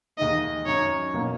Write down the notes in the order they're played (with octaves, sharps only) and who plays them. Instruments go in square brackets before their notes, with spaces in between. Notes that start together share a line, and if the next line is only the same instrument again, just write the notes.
[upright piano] D#2 D#3 G#3 D#4 [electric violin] D#5
[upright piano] F#2 D#3 F#3 [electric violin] C#5
[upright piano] B2 F#3 A#3 C#4